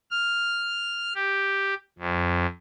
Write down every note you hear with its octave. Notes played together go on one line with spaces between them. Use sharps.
F6
G4
F2